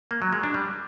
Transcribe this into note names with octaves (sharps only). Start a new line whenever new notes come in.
A#3
F#3
G#3
D4
G3